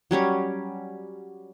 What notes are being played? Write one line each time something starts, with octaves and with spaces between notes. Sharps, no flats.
F#3 G3 C#4 C#5